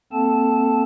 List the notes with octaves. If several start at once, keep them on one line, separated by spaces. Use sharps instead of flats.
A#3 C4 A4 A5